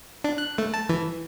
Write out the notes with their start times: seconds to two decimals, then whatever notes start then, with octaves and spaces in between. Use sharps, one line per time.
0.24 D4
0.38 F#6
0.58 A3
0.74 A5
0.89 E3